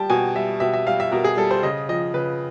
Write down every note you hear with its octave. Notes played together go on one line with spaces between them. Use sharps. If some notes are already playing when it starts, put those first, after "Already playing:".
Already playing: G3 G5 A5
B2 G#5
G3 E5
B2 E5
E5
G3 F5
E5
B2 A#4
G#4
G3 A4
C5
C#3 D#5
F3 D#5
C#3 B4